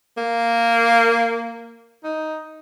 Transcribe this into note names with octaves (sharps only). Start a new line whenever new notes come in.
A#3
D#4